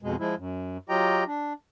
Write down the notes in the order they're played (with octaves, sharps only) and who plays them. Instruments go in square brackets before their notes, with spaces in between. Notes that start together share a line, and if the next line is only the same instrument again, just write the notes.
[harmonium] F2 B2 G#3
F3 G#3 E4
F#2
F#3 F4 G4 D#5 G5 A#5
D4